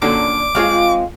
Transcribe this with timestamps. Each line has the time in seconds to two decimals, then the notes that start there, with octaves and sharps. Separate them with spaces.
0.02 F#2 A#2 D3 D4 D6
0.55 G#3 C4 F4 G#4 C#5 F5